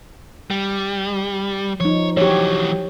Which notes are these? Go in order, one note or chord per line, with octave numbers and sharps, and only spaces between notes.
G3
F3 D#4 C#5
E3 F#3 G4 C#5